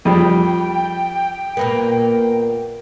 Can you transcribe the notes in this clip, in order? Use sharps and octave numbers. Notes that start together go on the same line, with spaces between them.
F2 G3 G5
A#2 A#3 B3